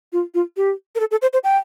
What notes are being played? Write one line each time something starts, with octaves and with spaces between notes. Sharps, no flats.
F4
F4
G4
A#4
A4
A4
C5
C5
G5